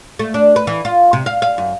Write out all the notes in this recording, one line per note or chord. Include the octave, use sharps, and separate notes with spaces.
A3
D4
B4
E3
F4
C3
F5
F5
F#2